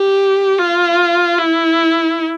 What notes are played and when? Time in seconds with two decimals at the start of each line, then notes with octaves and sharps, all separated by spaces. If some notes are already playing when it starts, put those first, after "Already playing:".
Already playing: G4
0.58 F4
1.39 E4